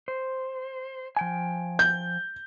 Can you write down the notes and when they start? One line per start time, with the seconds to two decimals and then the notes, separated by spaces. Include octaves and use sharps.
0.08 C5
1.17 F3 G5 G#5
1.79 G6